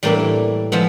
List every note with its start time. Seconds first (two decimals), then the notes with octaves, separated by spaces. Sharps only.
0.03 A2 E3 G3 A#3 D4
0.72 F3 G#3 B3